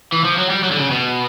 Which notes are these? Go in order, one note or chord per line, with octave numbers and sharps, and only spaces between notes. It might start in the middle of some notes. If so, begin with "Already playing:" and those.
E3
F3
F#3
G3
F#3
D3
C#3
B2